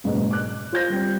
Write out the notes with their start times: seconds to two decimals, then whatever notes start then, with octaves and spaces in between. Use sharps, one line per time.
0.04 F#1 G#2 B2
0.31 D6 F#6
0.72 F4 C5 G6 A#6
0.90 G3 C4